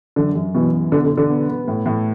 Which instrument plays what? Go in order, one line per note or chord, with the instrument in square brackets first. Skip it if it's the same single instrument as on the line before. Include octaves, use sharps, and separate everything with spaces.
[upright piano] F#2 [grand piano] D3
[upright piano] F#2
[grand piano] B2 [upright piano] E3
[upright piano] B3
[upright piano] B2 [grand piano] D3
[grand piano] D3
[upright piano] B2
[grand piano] D3
[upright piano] B3
B3
A2
A2